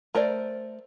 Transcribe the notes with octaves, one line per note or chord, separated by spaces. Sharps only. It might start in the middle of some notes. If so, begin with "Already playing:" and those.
A3 A#4 C5 D5